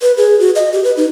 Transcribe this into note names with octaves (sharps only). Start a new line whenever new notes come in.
B4
G#4
F#4
D#5
G4
B4
D#4